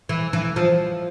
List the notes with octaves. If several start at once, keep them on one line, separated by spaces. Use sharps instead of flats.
E3
E3
F3